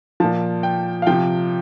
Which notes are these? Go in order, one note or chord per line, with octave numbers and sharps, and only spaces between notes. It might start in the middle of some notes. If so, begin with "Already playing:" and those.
A#2 F3 A5
G5
F5
C3 F3 G5